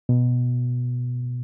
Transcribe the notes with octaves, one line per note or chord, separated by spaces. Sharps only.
B2